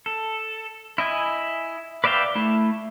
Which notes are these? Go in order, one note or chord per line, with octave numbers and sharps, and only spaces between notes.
A4
E4 D#5 G#5
B4 D5 E5 F5 G5
A3 E4